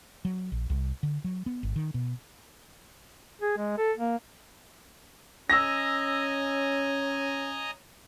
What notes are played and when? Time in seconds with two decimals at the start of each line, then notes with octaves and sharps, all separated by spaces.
0.25 F#3
0.52 A#1
0.70 C2
1.03 D3
1.24 F#3
1.46 B3
1.63 G#1
1.76 D#3
1.94 B2
3.41 G#4
3.57 G#3
3.78 A4
3.97 A#3
5.50 C#4 D#5 G#5 A#5 E6 A#6